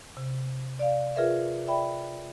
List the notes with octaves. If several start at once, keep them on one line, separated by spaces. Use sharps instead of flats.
C3
D5 F5
F4 G#4 A#4 B4 E5
D5 E5 G5 B5